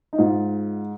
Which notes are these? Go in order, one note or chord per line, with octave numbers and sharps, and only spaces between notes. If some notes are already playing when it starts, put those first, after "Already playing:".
D#4
G#2 F4